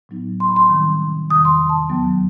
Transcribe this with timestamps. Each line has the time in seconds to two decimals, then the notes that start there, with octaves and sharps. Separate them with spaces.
0.09 A2 F#3 B3 D#4
0.40 C6
0.48 B5
0.56 C6
0.69 C3 D#3 G3 C4 D#4
1.30 E2 C3 D#3 D#6
1.45 C6
1.69 A5
1.89 D#2 D#3 F#3 B3